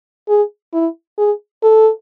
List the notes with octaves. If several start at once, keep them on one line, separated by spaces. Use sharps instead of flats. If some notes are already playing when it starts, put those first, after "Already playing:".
G#4
E4
G#4
A4